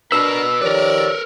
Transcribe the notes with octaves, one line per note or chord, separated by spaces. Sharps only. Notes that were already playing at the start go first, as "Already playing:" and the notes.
D4 F#4 A#4 B4 E6
D#3 F3 G4 A#4 B4 C#5 D5